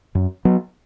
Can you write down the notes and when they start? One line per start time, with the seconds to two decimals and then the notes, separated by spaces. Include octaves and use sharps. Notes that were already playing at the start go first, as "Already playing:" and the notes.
0.15 F#2
0.45 F#3 B3